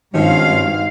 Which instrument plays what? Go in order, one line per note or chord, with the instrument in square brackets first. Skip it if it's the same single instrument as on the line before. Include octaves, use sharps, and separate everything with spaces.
[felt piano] G#1 [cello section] G2 F5 [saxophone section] F3 C4 C#4